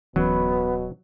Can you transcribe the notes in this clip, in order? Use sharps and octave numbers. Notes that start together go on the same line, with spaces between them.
D1 B2 E3 F#3 B3 C#4